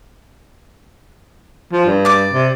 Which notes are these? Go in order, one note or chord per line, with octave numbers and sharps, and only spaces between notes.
F3
G2
D5 D6
C3